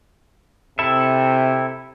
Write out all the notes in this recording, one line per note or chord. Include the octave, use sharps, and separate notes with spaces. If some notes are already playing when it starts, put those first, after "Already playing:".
C3 E4 A4 E5